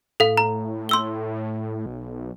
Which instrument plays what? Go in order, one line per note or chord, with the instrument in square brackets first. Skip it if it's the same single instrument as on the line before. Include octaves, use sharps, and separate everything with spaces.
[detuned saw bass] A2 [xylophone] A4 F5
[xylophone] A#5
C6 E6 G7
[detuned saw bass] B1